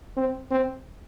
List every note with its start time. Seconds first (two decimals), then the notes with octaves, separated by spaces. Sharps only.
0.17 C4
0.51 C4